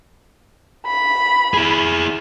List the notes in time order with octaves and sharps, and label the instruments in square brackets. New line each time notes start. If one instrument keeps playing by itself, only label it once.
[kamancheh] B5
[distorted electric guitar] E4 G#4